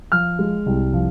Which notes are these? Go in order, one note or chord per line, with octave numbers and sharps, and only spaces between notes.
F3 F6
G#3
C2
F3